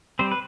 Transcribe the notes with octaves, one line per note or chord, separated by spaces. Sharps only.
G3 C4 C5
B4